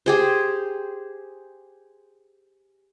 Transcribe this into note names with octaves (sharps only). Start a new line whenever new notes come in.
G4 G#4 C5